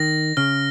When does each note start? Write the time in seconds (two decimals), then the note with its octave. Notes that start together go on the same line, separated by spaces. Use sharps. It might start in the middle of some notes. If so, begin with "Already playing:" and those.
Already playing: D#3 A#6
0.37 C#3 F6